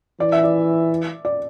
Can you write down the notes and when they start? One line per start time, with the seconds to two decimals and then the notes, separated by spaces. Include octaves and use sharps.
0.20 E3 D5
0.32 E5
0.44 D5
1.25 D5